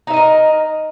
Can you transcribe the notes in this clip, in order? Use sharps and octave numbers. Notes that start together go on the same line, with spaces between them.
D#4 A#4 D#5 E5